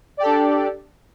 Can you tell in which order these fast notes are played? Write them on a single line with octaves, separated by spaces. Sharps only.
D5 G4 A4 D4